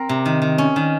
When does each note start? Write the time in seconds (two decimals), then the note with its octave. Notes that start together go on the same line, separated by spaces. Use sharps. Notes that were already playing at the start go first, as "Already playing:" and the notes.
Already playing: C4 A#4
0.09 C3
0.25 D#3
0.42 D#3
0.58 C#4
0.76 D#3